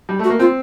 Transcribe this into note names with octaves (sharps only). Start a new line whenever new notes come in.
G3
A3
F#4
A#3
C4 F4